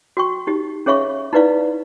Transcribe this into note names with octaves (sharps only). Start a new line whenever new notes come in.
F#4 G5 C#6
D#4 G4
C#4 G#4 C#5 E5 F5 C#6
D#4 E4 B4 D5 F5